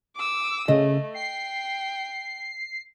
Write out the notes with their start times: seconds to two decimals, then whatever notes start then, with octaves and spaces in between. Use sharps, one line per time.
0.16 D6 E6
0.68 C#3 A3 D#5
1.14 G5 C7